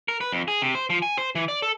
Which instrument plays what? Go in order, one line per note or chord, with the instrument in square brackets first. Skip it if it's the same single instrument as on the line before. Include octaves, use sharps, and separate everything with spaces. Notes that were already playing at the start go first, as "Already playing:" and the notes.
[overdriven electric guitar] A#4
B4
F2
G#4
C3
C5
F3
G#5
C5
E3
D5
A4